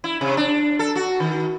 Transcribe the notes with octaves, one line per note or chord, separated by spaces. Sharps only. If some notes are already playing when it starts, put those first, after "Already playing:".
E4
C3
D4
A4
F#4
D#3